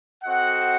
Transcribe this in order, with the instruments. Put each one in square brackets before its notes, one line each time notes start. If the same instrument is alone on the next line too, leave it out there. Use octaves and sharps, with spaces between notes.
[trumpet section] C4 F#4 A4 D#5 F#5